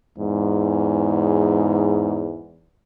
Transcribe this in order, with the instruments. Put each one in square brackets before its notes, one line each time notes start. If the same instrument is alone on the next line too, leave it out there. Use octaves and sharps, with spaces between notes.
[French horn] E2 [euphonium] G#2